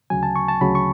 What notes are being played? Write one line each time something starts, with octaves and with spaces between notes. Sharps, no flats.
D2 C#3 F#3 G#5
A5
C#6
A5
D2 C#3 F#3 B5
C#6